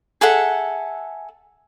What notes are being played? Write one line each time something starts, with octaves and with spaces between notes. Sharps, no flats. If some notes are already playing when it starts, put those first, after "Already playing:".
G#4 A4 E5 F#5